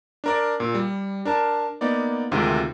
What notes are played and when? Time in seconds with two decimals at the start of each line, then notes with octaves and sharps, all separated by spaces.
0.24 D4 A#4 D5
0.60 A#2
0.74 G3
1.25 D4 A#4 A5
1.81 A#3 B3 D#4 D5
2.31 D2 C3 D#3 G#3 F4